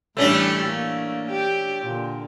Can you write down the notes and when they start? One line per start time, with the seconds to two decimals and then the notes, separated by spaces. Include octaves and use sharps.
0.17 A2 E3 G3 A3 C#4 D4
0.66 A#3
1.31 G4
1.82 A#2 D3